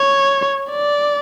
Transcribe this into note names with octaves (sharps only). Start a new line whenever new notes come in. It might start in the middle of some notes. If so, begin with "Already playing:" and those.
Already playing: C#5
D5